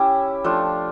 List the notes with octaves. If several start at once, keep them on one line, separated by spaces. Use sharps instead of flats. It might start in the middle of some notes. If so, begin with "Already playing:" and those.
Already playing: C#4 E4 G4
F3 A3 D4 F4